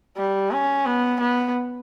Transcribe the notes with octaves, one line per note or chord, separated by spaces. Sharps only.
G3
C#4
B3
B3